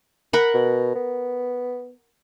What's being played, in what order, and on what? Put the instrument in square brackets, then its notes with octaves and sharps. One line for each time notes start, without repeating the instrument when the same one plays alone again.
[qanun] A#4 F#5 B5
[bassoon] B2
B3